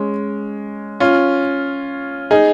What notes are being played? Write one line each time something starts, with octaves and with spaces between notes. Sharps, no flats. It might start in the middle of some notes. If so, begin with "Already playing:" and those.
Already playing: G#3 C#4
C#4 F4
D#4 G#4